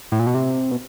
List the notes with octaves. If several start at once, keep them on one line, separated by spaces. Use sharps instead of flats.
A2
A#2
B2
C3
B2